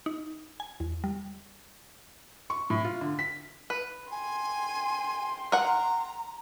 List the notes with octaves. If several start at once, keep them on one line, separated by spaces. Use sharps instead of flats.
D#4
G#5
E2
G3
C#6
A2
F4
D3
B6
B4
G5 G#5 C6
A#4 F#5 A#5